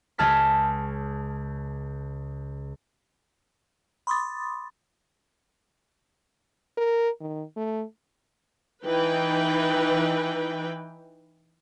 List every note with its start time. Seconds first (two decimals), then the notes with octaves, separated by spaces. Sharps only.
0.18 C#2 G#4 A5 F6 B6
4.07 B5 C6 D6 D#6 A6
6.77 A#4
7.21 D#3
7.57 A3
8.85 E3 D#4 B4 G5